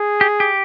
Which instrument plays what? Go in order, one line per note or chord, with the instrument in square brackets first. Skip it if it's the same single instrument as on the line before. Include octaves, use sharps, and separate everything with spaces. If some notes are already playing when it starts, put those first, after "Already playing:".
Already playing: [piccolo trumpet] G#4
[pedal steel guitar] G4
G4